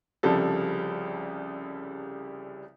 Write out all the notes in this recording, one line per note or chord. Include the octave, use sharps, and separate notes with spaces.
C2 C#3 F3 G3 A4